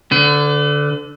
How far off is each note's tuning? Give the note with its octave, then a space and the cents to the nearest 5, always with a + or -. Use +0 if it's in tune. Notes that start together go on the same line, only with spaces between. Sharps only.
D3 -10 B4 +45